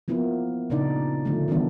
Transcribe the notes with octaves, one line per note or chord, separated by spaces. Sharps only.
F3 A#3 B3 E4
A#2 C#3 D4 D#4 D5
D3 F3 A3 A#3
D#3 E3 G3 B3 D4